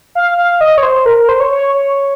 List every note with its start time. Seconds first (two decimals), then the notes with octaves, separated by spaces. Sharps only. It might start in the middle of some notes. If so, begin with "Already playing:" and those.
0.15 F5
0.38 F5
0.61 D#5
0.78 C#5
0.83 C5
1.06 A#4
1.17 A#4
1.29 C5
1.40 C#5
1.51 C#5
1.74 C#5